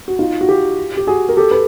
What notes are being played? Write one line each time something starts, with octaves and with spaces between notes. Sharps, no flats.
F#4
D#4 F4
F#4
F4 G4
G4
F#4 G#4
A#4
G4 A4
A4 B4